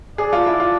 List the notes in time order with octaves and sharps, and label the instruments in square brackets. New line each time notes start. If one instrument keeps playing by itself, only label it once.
[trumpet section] D4 A4 D5 [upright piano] G#4
[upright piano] F4
E4
F4